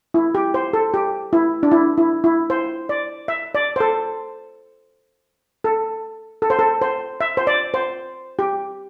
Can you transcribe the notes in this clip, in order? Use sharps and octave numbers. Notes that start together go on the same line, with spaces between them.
E4
G4
C5
A4
G4
E4
D4
E4
E4
E4
C5
D5
E5
D5
C5
A4
A4
A4
C5
A4
C5
E5
C5
D5
C5
G4